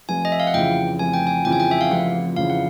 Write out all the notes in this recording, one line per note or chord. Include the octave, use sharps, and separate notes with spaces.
F1 G#5
D#5
E5
F5
F#5
F2 C#3 E3 G5
F1 G#5
G5
G#5
F2 C#3 E3 G5
G#5
G5
E5
F5
F1 F#5
F2 C#3 E3 F5
F#5